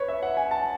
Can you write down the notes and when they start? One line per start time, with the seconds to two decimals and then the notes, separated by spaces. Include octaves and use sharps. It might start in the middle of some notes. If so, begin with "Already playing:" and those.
Already playing: B4 C#5
0.08 E5
0.23 F#5
0.37 G#5
0.51 A5